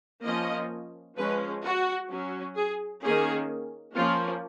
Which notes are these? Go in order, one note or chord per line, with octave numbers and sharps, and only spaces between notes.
F3 A#3 C#4 D#5
F3 G#3 C#4 B4
F#4
F#3 C#4
G#4
D#3 A#3 C#4 G#4
F3 A#3 C#4 F4